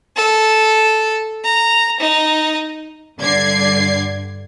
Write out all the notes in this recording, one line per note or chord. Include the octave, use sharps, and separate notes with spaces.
A4
A#5
D#4
G2 D3 D5 G#6 C7